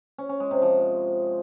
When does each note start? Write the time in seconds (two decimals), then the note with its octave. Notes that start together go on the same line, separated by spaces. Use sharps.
0.18 C#4
0.29 C#4
0.40 G#3
0.51 C3
0.62 F3